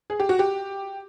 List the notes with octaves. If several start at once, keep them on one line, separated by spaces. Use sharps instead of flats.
G#4
G4
F#4
G4